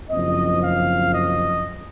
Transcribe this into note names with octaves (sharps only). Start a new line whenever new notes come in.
F#1 F#2 F3 C4 D#5
F5
D#5